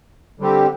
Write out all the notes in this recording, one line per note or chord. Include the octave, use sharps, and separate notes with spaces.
D3 G3 C4 G4